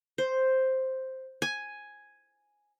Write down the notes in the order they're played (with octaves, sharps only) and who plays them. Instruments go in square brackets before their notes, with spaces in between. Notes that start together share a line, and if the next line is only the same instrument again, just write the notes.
[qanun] C5
G#5